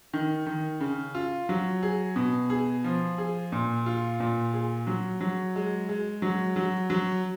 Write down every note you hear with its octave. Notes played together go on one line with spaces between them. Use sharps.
D#3
D#3
C#3
F4
F#3
G#4
B2
G#4
F3
G#4
A#2
F4
A#2
G#4
F#3
F#3
G#3
G#3
F#3
F#3
F#3